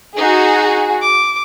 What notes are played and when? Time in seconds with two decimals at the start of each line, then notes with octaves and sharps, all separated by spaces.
0.17 D#4 F#4 G#4
1.02 D6